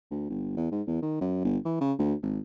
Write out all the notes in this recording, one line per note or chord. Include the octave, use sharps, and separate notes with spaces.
D2
G1
E2
G#2
E2
D#3
F#2
G1
E3
C#3
D2
G#1